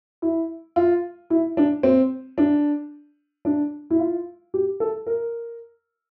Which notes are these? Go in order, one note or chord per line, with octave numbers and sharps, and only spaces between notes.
E4
F4
E4
D4
C4
D4
D4
E4
F4
G4
A4
A#4